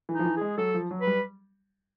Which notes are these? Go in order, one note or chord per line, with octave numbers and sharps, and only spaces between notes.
E3
D#4
F3
E3
G#3 G#4
F#3 A4
F3
F#3
B4
G3